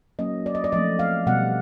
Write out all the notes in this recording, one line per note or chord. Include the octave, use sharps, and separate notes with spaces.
F#3 A#3 C#4 D#5
D5
D#5
D5
F3 A3 C4 D#5
F5
B2 G3 B3 F#5